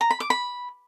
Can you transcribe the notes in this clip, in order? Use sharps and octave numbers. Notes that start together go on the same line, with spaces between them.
A#5
B5
D6
B5